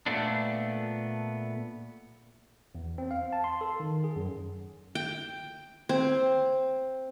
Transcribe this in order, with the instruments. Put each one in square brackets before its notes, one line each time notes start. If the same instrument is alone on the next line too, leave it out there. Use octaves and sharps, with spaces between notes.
[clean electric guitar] A#2 A3 B3 D4
[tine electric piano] E2
C4
F5
A5
C6
A4
D#3
G#4
F#2
[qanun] G5
C4